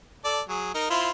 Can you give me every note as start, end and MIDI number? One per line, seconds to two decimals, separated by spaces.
0.24 0.41 69
0.24 0.41 74
0.49 0.69 54
0.49 0.69 68
0.74 0.88 63
0.74 0.88 70
0.90 1.11 64
0.90 1.11 65
0.90 1.11 72